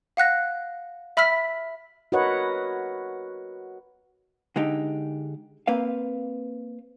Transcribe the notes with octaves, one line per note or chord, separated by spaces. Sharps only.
F5 F#5 F#6 A#6
E5 B5 E6 F6 B6
F#4 A#4 B4 C#5 D#5 F#5
D3 G#3 D#4 G4
A#3 C4 B4 F5